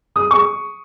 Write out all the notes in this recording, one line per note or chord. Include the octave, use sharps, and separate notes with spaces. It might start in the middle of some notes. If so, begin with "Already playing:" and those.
D#6
C#6